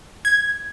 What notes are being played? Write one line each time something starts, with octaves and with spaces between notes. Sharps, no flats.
G#6